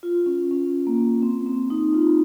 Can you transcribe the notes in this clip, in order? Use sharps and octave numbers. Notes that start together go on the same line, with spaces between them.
F4
C#4
C#4
A#3
C4
C4
D#4
F4